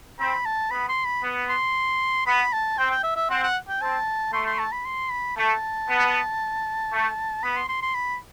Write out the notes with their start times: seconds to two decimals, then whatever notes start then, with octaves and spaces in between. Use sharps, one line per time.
0.19 C4 B5
0.45 A5
0.71 B3 B5
0.88 C6
1.05 B5
1.23 B3
1.49 C6
2.26 B3 B5
2.53 A5
2.78 C4 G5
2.91 G5
3.03 E5
3.16 E5
3.29 C4 F#5
3.43 F#5
3.68 G5
3.82 C4 A5
4.33 A3 C6
4.47 C6
4.59 A5
4.72 B5
4.85 C6
5.11 B5
5.37 A3 A5
5.89 B3
6.92 A3
7.43 B3 B5
7.57 C6
7.69 C6
7.82 C6
7.95 B5